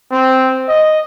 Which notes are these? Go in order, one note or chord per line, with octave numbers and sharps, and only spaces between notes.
C4
D#5